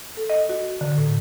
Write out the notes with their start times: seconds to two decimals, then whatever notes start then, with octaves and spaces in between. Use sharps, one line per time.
0.17 A4
0.30 D#5
0.49 F#4
0.81 D3
0.98 A2